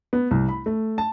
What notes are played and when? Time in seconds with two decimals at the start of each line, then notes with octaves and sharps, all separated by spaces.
0.13 B3
0.31 C2
0.49 B5
0.66 A3
0.98 A5